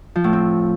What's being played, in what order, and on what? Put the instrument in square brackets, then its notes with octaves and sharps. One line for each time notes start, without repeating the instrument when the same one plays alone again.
[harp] F3
A2
C4